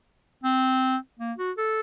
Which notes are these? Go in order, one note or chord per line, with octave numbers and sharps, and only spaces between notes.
C4
A#3
F#4
A4